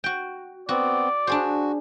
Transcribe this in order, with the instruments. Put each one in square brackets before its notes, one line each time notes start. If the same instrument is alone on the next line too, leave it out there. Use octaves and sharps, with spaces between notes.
[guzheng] F#4 G5
[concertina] B3 C4 [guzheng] F#4 [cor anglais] D5
[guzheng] D4 G#4 C5 [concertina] F#4